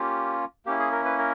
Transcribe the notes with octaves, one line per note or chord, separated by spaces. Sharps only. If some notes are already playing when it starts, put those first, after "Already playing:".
Already playing: A#3 C#4 F4 G4
A#3 C#4 E4 G4
G#4
A#4
B4
A#4